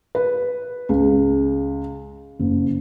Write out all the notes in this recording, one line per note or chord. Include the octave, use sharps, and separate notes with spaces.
B4
C#2
F#1